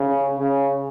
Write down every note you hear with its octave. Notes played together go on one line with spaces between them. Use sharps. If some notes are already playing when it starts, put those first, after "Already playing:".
Already playing: C#3
C#3